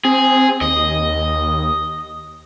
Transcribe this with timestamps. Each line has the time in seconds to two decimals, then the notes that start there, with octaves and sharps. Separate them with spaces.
0.05 C4 G#4
0.61 D#2 D#5